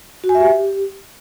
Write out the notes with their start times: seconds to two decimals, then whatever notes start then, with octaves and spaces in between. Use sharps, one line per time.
0.24 F#4
0.29 G#5
0.35 E5
0.40 G4